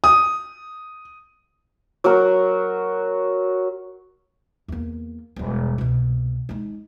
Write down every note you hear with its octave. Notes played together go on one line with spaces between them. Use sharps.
D#6
F#3 F#4 A#4
E2 A#3
E1 G3
C2 B2
G#3 D#4